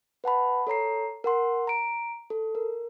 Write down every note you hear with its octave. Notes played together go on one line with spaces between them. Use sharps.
B4 F#5 A5 B5
A4 C#5 A#5 C7
A#4 F#5 C6
A#5 D7
A4
A#4